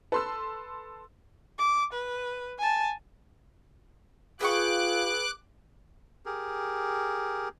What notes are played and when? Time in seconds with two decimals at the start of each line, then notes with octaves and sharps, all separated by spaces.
0.12 A4 B4 C6 E6
1.58 D6
1.93 B4
2.58 G#5 A5
4.41 F4 G#4 B4 F5 G5 C#6 D6 F#6
6.26 G4 G#4 A#4